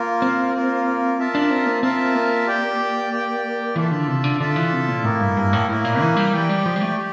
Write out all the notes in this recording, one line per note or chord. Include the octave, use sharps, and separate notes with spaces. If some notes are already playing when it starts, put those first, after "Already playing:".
Already playing: A#3 F4 A#4
C4
A#3 F4 A#4
F4 A#4 E5 A5
D4
C4
A#3
C4 F4 A#4 E5 A5
A#3
G4 D5 G5
G4 D5 G5
E3 F4 A4 E5 A5
D3
C3
D3
D3 F4 A4 E5 A5
E3
C3
A#2
A2 A#3 E4 A#4
G2
G2
A2
A2 A#3 E4 A#4
A#2
E3
G3
E3 G4 D5 G5
G3
F3
G3
A3
G4